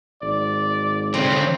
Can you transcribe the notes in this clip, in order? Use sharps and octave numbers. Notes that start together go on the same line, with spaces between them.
G#1 D5
D3 C4 C#4